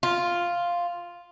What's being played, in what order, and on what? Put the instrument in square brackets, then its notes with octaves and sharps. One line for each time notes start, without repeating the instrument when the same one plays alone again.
[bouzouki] F4